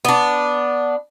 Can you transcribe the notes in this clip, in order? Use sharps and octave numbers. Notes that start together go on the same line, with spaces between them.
B3 D4